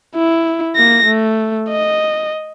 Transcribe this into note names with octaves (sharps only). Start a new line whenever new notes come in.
E4
A#3 A#6
A3
D#5